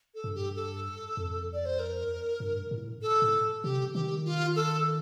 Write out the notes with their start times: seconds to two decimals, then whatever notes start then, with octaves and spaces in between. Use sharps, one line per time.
0.15 A4
0.24 G2
0.35 G4
0.56 A4
1.17 F2
1.53 D5
1.65 C5
1.79 A#4
2.40 G2
2.71 A2
3.02 A4
3.22 A2
3.63 C3 G4
3.94 D#3 G4
4.25 F4
4.56 A4